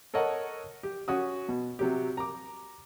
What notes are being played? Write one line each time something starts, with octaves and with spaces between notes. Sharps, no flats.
A4 A#4 C#5 D#5 F#5
G4
C#4 F#4 D#6
B2
C3 F#3 G4
A#5 D6